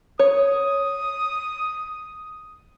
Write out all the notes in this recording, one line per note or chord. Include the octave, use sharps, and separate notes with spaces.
C#5 D#6